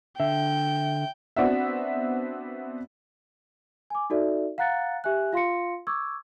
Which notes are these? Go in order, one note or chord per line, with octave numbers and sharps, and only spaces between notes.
D3 E5 G5
B3 C4 D4 F#4 E5
G#5 D6
D#4 F#4 A4 D5 E5
F5 F#5 A#5 F#6 A6 C#7
G4 E5 G#5 F#6
F4 F5 C6 A#6 C#7
C#6 D6 E6 G#6